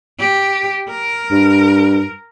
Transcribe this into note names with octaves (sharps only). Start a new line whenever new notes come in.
G4
A#4
G2